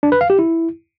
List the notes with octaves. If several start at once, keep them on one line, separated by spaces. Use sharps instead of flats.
D4
B4
F5
G4
E4